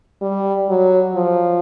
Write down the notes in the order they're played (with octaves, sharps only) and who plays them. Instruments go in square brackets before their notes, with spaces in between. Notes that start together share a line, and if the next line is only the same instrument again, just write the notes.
[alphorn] G3
F#3
F3